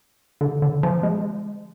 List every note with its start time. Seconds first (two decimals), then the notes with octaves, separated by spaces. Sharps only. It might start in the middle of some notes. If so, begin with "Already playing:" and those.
0.41 D3
0.62 D3
0.83 F3
1.03 G#3